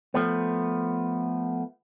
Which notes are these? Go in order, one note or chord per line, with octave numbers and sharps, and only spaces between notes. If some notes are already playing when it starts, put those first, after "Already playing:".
F3 A3 B3